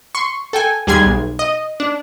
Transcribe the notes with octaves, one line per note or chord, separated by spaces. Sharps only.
C6 C#6
A4 G5 G#5
D#2 G3 G#4 G#5 C6 G#6
B1
D#5
D4